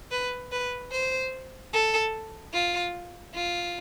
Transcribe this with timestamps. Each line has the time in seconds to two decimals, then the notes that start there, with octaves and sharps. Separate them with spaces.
0.11 B4
0.52 B4
0.92 C5
1.73 A4
2.54 F4
3.35 F4